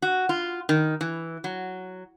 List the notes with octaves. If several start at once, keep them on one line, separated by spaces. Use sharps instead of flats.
F#4
F4
D#3
E3
F#3